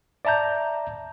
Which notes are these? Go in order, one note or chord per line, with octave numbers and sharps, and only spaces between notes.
D5 E5 A5 A#5 G6